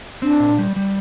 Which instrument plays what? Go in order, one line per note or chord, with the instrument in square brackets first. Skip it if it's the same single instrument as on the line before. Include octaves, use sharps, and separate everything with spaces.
[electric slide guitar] C4 [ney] D4
[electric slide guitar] A#2
G3
G3